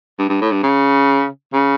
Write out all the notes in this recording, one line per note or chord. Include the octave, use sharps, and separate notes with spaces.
G2
G2
A2
G2
C#3
C#3